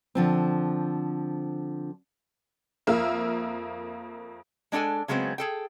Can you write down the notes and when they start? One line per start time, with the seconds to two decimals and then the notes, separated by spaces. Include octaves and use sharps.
0.15 D3 F3 C4
2.87 F2 A#3 E5 E6 F6
4.72 G#3 D4 F4 A4 G#5
5.08 C#3 F#3 G#3 B3 C4
5.38 G#4 A4 G5